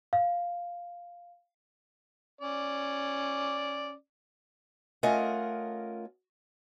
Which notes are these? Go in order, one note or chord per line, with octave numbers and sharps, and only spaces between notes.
F5
C#4 D5
A3 C#4 F4 A#4 D#5 F#5